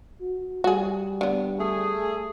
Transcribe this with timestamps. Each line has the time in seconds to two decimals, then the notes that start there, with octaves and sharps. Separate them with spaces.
0.21 F#4
0.64 G3 F#4 G#4
1.21 D3 B3
1.59 A3 G#4